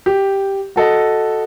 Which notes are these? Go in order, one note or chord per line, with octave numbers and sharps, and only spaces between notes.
G4
F#4 A4 D#5